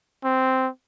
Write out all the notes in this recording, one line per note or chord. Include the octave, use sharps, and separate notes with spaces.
C4